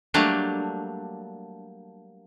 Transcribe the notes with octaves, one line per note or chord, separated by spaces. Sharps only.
F#3 G3 A3 A#3 D4